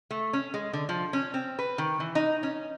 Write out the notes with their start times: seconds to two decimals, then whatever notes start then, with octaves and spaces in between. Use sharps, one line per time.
0.11 A3
0.33 C#4
0.54 G#3
0.73 D3
0.89 F3
1.13 C#4
1.34 C4
1.59 B4
1.78 D#3
2.00 E3
2.15 D#4
2.43 C#4